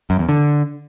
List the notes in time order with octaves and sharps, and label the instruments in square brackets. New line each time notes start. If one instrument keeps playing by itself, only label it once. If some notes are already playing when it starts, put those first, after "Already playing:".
[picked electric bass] F#2
E2
D3